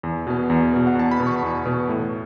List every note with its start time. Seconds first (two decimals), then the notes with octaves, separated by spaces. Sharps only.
0.03 E2
0.27 B2 B3
0.50 E2
0.74 B2 B3
0.87 F#5
0.95 E2 A5
1.11 B5
1.20 B2 B3
1.27 C#6
1.43 E2
1.66 B2 B3
1.89 A2